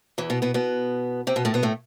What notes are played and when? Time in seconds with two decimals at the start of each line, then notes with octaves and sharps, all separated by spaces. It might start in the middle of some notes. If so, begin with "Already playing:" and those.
0.18 E2 E3
0.30 B2 B3
0.42 B2 B3
0.54 B2 B3
1.27 C3 C4
1.36 B2 B3
1.45 A2 A3
1.54 B2 B3
1.63 A2 A3